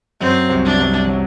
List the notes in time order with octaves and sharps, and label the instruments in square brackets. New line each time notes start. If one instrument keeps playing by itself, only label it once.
[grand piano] F#2 F#3 [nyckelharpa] C4
[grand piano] C2 C3
[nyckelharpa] D4
[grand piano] C2 C3
F#3